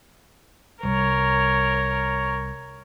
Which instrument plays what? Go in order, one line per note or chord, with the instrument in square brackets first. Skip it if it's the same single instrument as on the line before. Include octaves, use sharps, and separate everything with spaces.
[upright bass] C2 [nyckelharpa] A#4 C#5